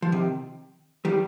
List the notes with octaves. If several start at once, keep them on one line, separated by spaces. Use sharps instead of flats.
F3
C3 D#3
D#3 G3